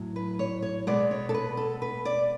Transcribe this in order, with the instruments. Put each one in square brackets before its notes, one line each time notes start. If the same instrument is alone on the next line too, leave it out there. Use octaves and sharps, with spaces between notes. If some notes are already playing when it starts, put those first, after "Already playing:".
Already playing: [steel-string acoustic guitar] A2 F#3
B4
C#5
C#5
B2 G#3 B3 D5
C#5
A4
B4
A4
B4
D5